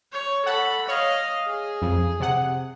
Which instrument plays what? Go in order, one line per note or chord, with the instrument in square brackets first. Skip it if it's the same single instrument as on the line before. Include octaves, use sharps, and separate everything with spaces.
[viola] C#5
[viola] A4 B5 [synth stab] F#5
[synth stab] C#5 [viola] D#5 F5
[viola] G#4
[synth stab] F2
C3 F#5